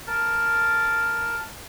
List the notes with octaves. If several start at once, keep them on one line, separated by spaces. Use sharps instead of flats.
A#4 A5